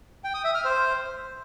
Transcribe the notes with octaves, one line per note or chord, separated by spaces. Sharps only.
G5
D#6
E5
F6
C5